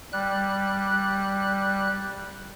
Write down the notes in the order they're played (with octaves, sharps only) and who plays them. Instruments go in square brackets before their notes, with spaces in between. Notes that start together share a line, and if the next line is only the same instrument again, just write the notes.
[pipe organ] G3 F#6